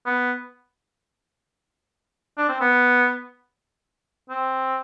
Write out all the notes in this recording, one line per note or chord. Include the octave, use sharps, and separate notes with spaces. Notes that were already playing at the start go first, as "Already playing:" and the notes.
B3
D4
C4
B3
C4